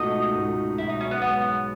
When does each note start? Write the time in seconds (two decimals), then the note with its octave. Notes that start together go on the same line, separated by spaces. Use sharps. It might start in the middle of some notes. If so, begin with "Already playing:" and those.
Already playing: C#2 B2 A3 D#4 F#4 D#5
0.34 C#2 B2 A3 D#4 F#4
0.78 B1 B2 G#3 E4
0.90 D#4
1.01 C#4
1.11 B3
1.22 B1 B2 G#3 B3